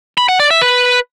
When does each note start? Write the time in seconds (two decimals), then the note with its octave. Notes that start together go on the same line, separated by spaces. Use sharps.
0.18 B5
0.29 F#5
0.40 D5
0.51 E5
0.62 B4